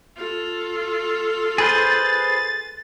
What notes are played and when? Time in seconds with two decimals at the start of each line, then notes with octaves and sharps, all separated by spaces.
0.17 F4 A4
1.58 G#4 B4 C5 A6